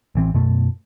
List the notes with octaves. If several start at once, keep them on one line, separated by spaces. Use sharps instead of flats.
A1 E3 C4
F#2 B2 A3